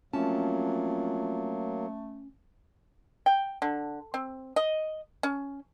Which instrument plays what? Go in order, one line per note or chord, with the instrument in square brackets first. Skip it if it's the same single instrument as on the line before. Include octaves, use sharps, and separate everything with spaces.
[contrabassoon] F2 [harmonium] F#3 A#3 [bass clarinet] A3 [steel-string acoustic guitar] C#4 A5
[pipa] G5
D3
C4
D#5
C#4